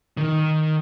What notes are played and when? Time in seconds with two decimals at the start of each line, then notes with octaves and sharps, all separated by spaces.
0.17 D#3